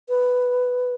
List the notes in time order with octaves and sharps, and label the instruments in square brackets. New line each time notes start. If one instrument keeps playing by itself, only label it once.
[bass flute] B4